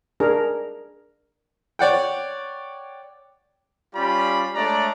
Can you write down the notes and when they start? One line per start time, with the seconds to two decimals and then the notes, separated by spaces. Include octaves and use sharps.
0.20 D4 G#4 A#4
1.79 C#5 D5 F#5 G5
3.96 G3 C#4 F4 G4 D5 B5
4.55 G#3 A3 D4 C#5 D5 A#5